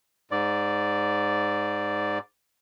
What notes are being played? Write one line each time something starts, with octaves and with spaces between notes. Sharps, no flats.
G#2 D5